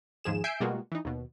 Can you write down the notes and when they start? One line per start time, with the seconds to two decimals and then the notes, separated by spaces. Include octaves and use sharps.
0.24 D#2 G#2 F3 G#4 E7
0.44 E5 G#5 G6 C7 D7
0.60 B2 G3 G#3 A#3 F4 F#4
0.92 E3 D#4
1.05 D#2 B2